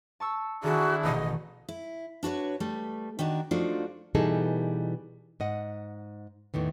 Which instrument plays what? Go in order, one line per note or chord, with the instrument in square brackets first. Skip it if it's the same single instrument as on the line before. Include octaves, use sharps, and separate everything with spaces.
[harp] A5 C#6 E6
[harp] D#3 A4 [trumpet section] D4 E4 [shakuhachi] F#4 [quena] G#4
[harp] A1 B2 [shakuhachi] D#5
[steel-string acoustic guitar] E4
D4 F#4 B4 C#5
G3 A3 B4
D#3 D4 F#4 A#4
F3 A3 D4 D#4 F4 F#4
[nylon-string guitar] B2 E3 G3 D#4 G#4 A4
G#2 D#5 F#5
E2 A2 D#3 E3